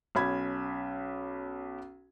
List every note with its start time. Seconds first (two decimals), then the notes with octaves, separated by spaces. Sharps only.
0.15 B1 C#4 B5 G#6